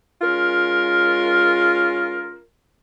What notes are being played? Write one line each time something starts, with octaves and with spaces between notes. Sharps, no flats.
G#3 C#4 F4 A#4